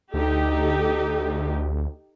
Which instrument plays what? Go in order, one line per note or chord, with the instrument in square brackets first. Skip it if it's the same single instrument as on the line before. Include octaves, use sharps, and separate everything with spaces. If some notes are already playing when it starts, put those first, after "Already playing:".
[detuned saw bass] D2 [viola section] D#4 G4 A4